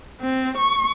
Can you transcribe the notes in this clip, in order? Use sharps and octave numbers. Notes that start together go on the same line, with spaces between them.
C4
C#6